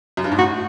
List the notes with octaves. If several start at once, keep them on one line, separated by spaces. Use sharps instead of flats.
F#2
G2
G#2
A2 F#4